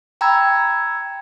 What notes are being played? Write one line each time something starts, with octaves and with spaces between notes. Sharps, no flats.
G5 A#5 B5 E6 G#6